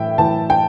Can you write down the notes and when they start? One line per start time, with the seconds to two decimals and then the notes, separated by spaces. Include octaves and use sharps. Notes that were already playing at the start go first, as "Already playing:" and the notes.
Already playing: A2 E3 E5 G5
0.18 A2 E3 A5
0.50 G5